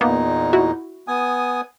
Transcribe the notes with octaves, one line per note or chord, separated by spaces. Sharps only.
E2 A#2 A#3 B3 D#4
E4 F#4
B3 G#5 D#6